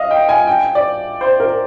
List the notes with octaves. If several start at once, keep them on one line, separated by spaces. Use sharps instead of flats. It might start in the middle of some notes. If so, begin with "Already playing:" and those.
Already playing: D#5 F5
G5
G#5
G5
D5
C5
A#4